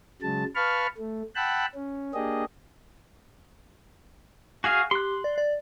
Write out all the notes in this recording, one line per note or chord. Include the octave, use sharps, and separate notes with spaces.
C#3 F#3 G#3 A5
B4 F5 A5 B5 C#6 F6
A3
F#5 G5 A5 B5 E6 F#6
C#4
A#3 D4 G4 G#4 D#5
F#4 G#4 F5 G#5
G4 C6 F#6
D5
D5